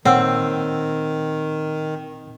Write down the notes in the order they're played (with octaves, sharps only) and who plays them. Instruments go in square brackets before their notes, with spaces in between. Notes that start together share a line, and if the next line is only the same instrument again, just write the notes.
[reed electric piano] A#2 [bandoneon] D#3 [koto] C4 [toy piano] C#5 F#5 E6